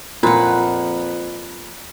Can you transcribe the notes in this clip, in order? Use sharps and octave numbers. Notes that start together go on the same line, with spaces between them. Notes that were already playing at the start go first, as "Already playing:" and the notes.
F2 A#2 B4 F#5